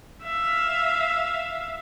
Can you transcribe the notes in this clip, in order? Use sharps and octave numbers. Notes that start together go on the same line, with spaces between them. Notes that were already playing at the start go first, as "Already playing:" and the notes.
E5 F5